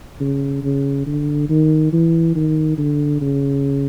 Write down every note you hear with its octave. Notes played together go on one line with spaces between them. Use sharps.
C#3
C#3
D3
D#3
E3
D#3
D3
C#3